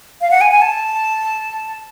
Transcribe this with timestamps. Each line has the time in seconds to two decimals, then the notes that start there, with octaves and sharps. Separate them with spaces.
0.21 F5
0.31 F#5
0.41 G#5
0.51 G#5
0.62 A5